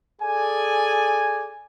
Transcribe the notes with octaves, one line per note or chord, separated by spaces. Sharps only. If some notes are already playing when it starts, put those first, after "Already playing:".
G#4 A4 D5 G#5